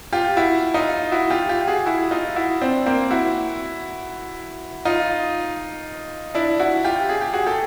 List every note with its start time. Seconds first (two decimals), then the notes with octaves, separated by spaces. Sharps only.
0.13 F4 G4
0.37 E4 F#4
0.74 D#4 F4
1.12 E4 F#4
1.30 F4 G4
1.49 F4 G4
1.68 F#4 G#4
1.86 E4 F#4
2.11 D#4 F4
2.36 E4 F#4
2.61 C4 D4
2.86 A#3 C4
3.11 E4 F#4
4.85 D#4 F4
6.35 D4 E4
6.59 E4 F#4
6.85 F4 G4
7.09 G#4
7.21 G4
7.34 F#4 G#4
7.46 G4 A4